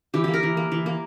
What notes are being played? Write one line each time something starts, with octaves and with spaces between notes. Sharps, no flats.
E3 G4
A#3 G4
A#4
E3
A#3
E3
A#3